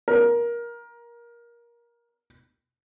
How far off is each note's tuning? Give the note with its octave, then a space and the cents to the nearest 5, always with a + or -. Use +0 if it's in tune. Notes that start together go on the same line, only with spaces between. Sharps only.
A#4 +20